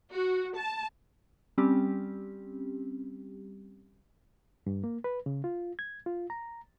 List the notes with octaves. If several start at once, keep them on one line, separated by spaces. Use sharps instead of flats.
F#4
A5
G3 C4 C#4 G4
G2
A#3
B4
C#3
F4
G#6
F4
A#5